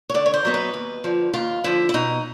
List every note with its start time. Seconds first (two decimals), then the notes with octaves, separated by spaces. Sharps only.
0.09 C#5
0.14 D3 D5
0.26 C#5
0.34 C5
0.45 F#3 B3 D#4
0.54 B4
0.74 D#2
1.04 D3 F3
1.34 D#2 F4
1.64 D3 F3 E4
1.89 E4
1.94 B2 D#4